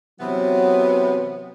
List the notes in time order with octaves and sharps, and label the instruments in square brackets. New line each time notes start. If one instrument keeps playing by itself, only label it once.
[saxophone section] C3 E3 B3 [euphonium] F#3